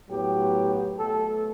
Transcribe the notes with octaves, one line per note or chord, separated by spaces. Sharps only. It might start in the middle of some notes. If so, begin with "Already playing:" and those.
A2 F#3 B3 G4
B2 F#3 A3 A4